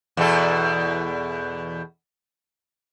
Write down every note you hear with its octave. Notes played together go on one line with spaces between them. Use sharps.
E2 B2 A4